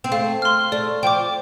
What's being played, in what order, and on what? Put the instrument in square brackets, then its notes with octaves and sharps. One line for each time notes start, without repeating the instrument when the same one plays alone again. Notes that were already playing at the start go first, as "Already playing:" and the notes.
[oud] C4
[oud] A3 [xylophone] F5
[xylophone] C6 F6
[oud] A3 [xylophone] D5
[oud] F3 [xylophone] G5 D6